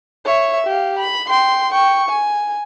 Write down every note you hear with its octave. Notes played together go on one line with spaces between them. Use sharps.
C#5 E5
G4 F5
B5
G5 C6
G5 C#6
G#5